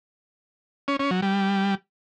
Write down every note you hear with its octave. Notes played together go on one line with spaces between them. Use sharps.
C#4
C#4
F#3
G3